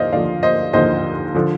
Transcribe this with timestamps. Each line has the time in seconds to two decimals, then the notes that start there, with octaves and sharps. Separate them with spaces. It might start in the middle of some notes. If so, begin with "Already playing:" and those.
Already playing: D#2 D3 F3 C5 D5 D#5 F5
0.12 D#2 D3 F3 D5 F5
0.43 C5 D#5
0.73 D#2 D3 F3 C5 D#5
1.34 D3 F3